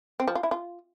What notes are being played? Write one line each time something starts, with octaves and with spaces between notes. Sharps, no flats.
C4
F3
F4
E4
F4